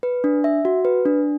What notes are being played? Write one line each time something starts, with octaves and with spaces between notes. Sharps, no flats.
B4
D4
E5
F#4
B4
D4